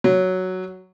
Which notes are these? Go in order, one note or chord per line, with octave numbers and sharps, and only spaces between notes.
F#3